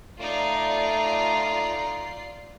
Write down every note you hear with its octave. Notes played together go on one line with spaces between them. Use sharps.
A3 D#4 F4 D5 A#5 C7